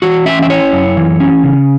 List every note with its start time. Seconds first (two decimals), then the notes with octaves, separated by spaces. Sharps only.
0.02 E3 F#4
0.26 C#4 E5
0.42 E5
0.50 E4 C#5
0.73 F#2
0.97 E3
1.20 C#4
1.44 C#3